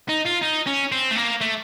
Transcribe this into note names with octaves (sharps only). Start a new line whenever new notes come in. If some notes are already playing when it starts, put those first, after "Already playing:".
D#4
F4
D#4
C#4
C4
A3
A#3
A3